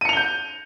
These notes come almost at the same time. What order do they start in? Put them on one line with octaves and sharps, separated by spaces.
D#7 C#7 F7 G7 G6